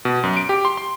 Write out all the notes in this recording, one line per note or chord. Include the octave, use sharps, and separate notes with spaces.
B2
F#2
D7
G4
C6
C6